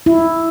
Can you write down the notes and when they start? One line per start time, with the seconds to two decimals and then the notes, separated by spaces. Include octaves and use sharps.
0.06 E4